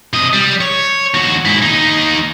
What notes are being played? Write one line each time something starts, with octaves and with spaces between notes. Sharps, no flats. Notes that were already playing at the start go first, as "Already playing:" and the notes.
C3 D#5
G3
C#5
D#2 F#4
G#2 E4
D#2 D#4